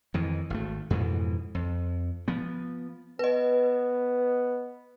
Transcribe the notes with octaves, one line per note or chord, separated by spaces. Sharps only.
F2 D#3 E3
G#1 A3
F2 G#2 B2 E3
F2
F3 B3
B3 B4 D#5